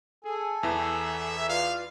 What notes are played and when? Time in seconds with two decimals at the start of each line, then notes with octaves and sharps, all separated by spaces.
0.24 G#4 A4 G#5
0.63 E2 E3 E5
1.49 F4 B4 D5 F5